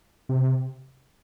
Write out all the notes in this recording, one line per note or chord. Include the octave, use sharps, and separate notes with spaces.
C3